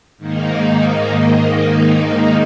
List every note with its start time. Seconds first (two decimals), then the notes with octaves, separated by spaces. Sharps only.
0.17 G#2 D#3 A#3 D#4